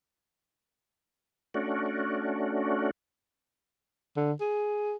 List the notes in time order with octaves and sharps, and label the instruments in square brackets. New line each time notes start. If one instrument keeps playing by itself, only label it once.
[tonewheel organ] A3 C#4 D4 F#4
[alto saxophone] D3
G#4